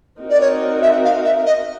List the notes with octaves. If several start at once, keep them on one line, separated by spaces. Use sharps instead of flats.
C4 D#4 F#4 A#4
D5
C#5
E5
F5
E5
D#5